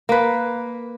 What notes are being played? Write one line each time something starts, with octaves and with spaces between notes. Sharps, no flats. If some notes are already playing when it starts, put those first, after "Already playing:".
A#3 B4